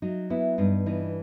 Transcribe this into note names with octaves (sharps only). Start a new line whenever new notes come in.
F#3 D#4
B3 E4
G2 D#4
E3 D#4